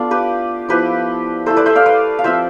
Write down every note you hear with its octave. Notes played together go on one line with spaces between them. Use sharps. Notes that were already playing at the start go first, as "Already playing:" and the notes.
Already playing: A3 B3 D4 F4
G4 B4
F3 B3 E4 G4 B4
A3 E4 A4 C5
B4 D5
C5 E5
D5 F5
B4 D5
F5
F3 C4 F4 C5 E5